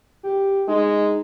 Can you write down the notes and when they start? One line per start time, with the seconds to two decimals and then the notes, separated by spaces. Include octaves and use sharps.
0.23 G4
0.68 G#3 D#4